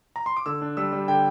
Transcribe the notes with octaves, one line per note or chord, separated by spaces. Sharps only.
A#5
C6
D6
D3 E6
D4
G3 E6
G3
D3 G5